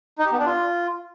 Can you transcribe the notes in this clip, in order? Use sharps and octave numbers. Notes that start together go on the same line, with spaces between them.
D#4
G4
B3
D4
F4